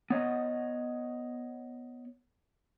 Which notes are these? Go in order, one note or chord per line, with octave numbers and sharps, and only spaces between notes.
B3 C#5 D#5 F#5